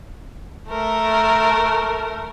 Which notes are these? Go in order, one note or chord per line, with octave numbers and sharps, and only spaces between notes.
A3 A#4